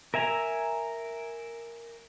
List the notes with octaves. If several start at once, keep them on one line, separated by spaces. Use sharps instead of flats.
A#4 E5 G#5 A#5